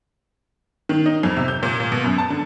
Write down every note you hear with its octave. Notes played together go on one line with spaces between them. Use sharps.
D#3
D#4
F2
C3
G6
A#2
A#2
B2
F#2
A5
D3